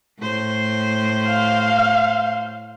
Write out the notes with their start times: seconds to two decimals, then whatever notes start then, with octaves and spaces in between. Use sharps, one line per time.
0.20 A2 C5
1.28 F5